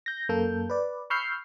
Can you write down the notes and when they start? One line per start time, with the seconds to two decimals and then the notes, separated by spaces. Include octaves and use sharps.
0.06 G6 A#6
0.29 F#2 A#3 A4 G6
0.70 B4 D5
1.10 B5 C#6 E6 F6 G6 C7